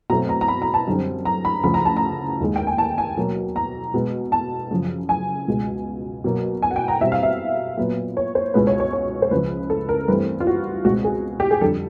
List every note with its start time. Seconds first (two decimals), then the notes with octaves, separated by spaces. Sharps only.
0.10 B2 F#3 A3 C4 A#5
0.29 A#5
0.41 A#5
0.48 B5
0.62 A#5
0.74 A5
0.87 F#2 D3 G3 C4
1.25 A#5
1.45 B5
1.63 D2 C#3 F3 B5
1.74 A#5
1.85 A5
1.97 A#5
2.40 D#2 D#3 G#3
2.56 G5
2.67 G#5
2.78 A5
2.98 G#5
3.17 B2 F#3 A#3
3.56 A#5
3.94 B2 G#3 B3
4.32 A5
4.71 F#2 C#3 F3
5.09 G#5
5.48 C#2 B2 G#3
6.24 B2 F#3 A#3
6.62 G#5
6.71 F#5
6.76 G5
6.88 A#5
7.01 B2 G3 C4 E5
7.12 F5
7.23 E5
7.77 A#2 F#3 B3
8.17 C#5
8.35 C5
8.54 C#2 B2 G#3 B3 B4
8.67 C#5
8.80 C#5
8.93 C#5
9.22 C5
9.31 C#2 C#3 F3 B4
9.70 A4
9.89 A#4
10.08 G2 E3 A3 C4 B4
10.40 F4
10.47 F#4
10.84 C#2 B2 G#3 C4 F#4
11.04 G#4
11.40 G4
11.51 G#4
11.61 F2 D3 G3 A4